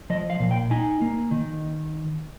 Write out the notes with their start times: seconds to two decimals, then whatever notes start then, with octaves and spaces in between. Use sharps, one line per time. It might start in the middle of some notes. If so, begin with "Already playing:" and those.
0.10 F3 D#5
0.30 F5
0.40 A#2
0.51 G5
0.71 D#4 G#5
1.01 A#3
1.31 D#3